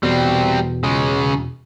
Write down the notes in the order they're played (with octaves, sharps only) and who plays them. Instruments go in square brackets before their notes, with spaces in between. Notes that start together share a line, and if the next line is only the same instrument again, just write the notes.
[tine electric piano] E2 B2 [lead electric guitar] G3 C4
[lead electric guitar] C#3 G#3